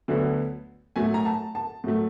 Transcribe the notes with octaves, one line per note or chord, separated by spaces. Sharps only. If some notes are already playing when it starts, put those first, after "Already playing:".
D2 D3 F#3 B3
A2 F#3 A3 G#5
A#5
A5
A5
A2 F#3 A3